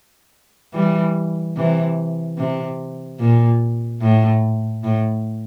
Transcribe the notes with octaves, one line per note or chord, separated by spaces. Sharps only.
E3 G3
C3 E3
C3
A#2
A2
A2